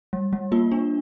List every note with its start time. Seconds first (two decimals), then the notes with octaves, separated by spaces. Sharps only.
0.13 G3
0.33 G3
0.52 A#3 F4
0.72 D4